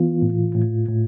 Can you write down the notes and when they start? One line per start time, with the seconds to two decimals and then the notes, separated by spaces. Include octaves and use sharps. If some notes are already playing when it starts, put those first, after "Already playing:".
Already playing: E3 B3 F4
0.22 A2
0.55 A2
0.89 A2